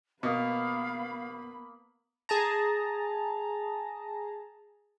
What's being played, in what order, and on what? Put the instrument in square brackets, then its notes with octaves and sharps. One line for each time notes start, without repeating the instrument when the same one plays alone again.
[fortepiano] B2 [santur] A#3 D#6 [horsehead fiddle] B3 B5 [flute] F5
[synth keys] G#4 A5 A#5